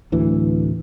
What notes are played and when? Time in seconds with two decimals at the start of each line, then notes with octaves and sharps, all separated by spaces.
0.12 D1 D2 E3